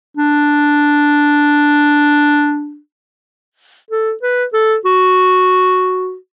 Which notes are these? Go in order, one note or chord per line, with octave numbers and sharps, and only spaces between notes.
D4
A4
B4
A4
F#4